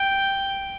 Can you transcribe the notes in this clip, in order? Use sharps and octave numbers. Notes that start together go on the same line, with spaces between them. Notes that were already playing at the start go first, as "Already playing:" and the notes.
Already playing: G5